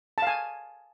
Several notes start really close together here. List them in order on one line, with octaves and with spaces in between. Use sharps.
A5 F5 G#5